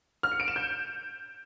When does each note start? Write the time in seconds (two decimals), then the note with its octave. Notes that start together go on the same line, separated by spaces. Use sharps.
0.23 F6
0.32 C#7
0.40 D7
0.48 E7
0.56 G6